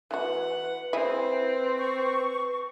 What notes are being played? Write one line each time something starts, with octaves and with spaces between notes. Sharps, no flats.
E3 F#4 B4 F#5
C4 E4 G#4
C#6